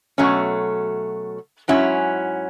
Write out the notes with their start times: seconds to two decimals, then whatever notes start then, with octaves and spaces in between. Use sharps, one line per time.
0.18 B2 F#3 A3 C#4
1.68 G#2 F#3 C#4 E4